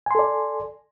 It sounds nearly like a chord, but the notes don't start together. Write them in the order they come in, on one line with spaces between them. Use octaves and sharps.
G#5 C6 A4 D5